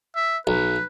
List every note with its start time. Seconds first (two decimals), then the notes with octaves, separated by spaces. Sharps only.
0.16 E5
0.47 B1 B4